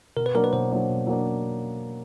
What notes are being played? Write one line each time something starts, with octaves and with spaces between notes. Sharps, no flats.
B2 A#4
B4
F#3 A#3 D4 A#4
B4
B2 C5
F#3 A#3 D4
B2
F#3 A#3 D4